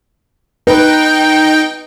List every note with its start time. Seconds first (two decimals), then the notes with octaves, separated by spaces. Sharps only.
0.67 D#4 B4 G5